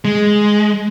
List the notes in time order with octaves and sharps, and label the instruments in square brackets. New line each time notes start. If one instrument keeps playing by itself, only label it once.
[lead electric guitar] G#3